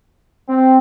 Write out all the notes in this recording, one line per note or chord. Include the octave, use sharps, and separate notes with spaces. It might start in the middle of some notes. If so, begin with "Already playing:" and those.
C4